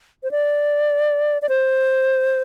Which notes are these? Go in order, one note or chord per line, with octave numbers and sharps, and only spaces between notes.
C5
D5
D5
C5